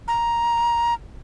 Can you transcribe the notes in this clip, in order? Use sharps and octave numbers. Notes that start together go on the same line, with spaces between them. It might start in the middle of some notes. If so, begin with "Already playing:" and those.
A#5